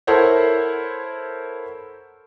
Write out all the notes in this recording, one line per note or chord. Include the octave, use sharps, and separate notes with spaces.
E4 A4 A#4 C5 C#5 F#5